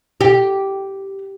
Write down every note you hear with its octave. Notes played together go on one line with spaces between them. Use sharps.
G4